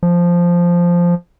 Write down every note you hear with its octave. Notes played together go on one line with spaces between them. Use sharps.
F3